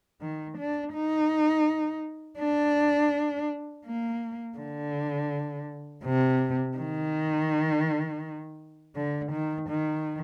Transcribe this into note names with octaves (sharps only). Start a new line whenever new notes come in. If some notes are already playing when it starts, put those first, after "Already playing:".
D#3
D4
D#4
D4
A#3
D3
C3
D#3
D3
D#3
D#3